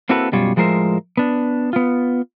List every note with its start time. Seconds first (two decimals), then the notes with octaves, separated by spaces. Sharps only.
0.09 A#3 C4 E4 F#4 A4 B4
0.32 F#2 B2 G3 F4 C#5
0.56 A2 F3 G#3 A#4 C5 E5
1.17 B3 D4
1.73 B3 F4